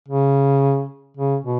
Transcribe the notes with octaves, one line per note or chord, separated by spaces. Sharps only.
C#3
C#3
B2